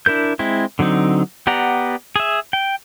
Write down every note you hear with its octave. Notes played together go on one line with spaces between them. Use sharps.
D4 E4 A#4 G6
G#3 C4 E4
D3 F#3 C4 D#4
B3 G4 D5 F#5 A#5
G#4 E5
G5